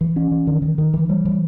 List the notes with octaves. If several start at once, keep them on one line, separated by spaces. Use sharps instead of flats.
E3
C#4
E3
D#3
D#3
D#3
E3
G3
E3